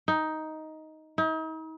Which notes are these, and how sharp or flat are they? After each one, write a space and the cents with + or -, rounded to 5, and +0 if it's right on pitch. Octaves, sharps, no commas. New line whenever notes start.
D#4 +10
D#4 +40